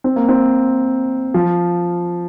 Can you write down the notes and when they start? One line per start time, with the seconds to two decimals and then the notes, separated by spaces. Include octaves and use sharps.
0.04 C4
0.16 A#3
0.28 C4
1.34 F3